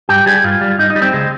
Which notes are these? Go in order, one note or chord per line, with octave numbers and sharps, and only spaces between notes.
G2 G4
G3 G#4
G2 F4
G3
G2 D#4
D#4
G3
C4
C#2 G#3